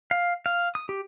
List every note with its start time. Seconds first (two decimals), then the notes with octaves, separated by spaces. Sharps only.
0.11 F5
0.46 F5
0.75 D#6
0.89 G4